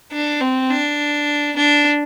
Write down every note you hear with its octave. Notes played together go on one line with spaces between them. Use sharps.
D4
C4
D4
D4